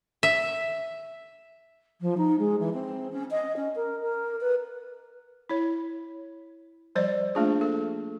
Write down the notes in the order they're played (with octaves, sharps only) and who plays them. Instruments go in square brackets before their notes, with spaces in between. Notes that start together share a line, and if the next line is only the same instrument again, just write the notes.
[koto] E5
[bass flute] F3
D#4
G#3
E3
C4
C#4
D#5
C#4
A#4
A#4
B4
[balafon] E4 C#5
F3 G3 C5 D5 D#5
A3 A#3 D4 F4 G#4
A4